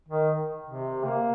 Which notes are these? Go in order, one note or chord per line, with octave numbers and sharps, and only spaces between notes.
D#3
C3
A#3